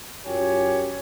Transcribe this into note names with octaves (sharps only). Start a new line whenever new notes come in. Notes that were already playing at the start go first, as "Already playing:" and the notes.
F#2 F4 G4 C#5 G#5